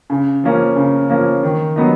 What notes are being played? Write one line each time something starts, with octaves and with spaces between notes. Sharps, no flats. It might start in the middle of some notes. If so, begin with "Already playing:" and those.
C#3
F3 A#3 C#4
C#3
F3 A#3 C#4
D#3
F#3 B3 D#4